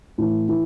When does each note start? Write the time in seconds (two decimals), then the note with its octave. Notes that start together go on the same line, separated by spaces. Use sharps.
0.18 A2 E3
0.49 E3